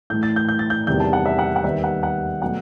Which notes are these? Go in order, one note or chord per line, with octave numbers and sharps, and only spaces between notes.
A2 E3 A3 G6
A6
G6
G6
A6
G6
E2 C3 D#3 G3 G6
A5
F#5
E5
F#5
F#5
D#2 D#3 G3 B3 E5
F#5
F#5
B2 F#3 A3 F#5